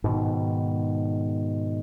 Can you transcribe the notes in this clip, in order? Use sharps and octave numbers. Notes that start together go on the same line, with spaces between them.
G#2 B2 D#3